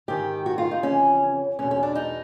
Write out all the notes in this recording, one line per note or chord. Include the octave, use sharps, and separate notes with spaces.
G#2 D#3 G4
F#4
F4
D#4
F2 C#3 E3 C#4
E2 B2 C#4
C#4
D4
D#4